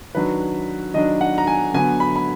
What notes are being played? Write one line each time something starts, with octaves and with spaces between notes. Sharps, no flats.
D#3 F#3 D4 B4
D#3 F#3 D4 D#5
F#5
A#5
G#5
D3 F#3 B3 G#5
B5
B5